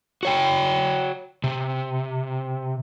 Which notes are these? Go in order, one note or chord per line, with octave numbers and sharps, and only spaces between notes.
F#4 C#5 G5
C3